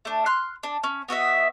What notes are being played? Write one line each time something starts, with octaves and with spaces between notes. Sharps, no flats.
A3 D4
C6 F6 F#6
D4
C#4
B3 F#4 D#5 E5